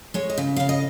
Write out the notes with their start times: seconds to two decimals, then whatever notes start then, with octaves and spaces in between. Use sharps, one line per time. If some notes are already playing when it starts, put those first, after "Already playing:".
0.14 G#3 C#5
0.30 D#5
0.38 C#3
0.56 C#3 F5
0.69 D#5